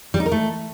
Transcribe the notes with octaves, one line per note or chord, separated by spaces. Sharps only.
G3
D#4
A#4
A3